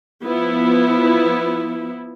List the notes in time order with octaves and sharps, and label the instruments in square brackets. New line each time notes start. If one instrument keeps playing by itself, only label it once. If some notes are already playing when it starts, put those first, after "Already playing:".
[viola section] F3 B3 E4